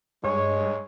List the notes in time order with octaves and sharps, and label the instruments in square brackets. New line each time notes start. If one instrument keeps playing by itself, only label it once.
[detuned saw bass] G2 [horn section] G#3 C#5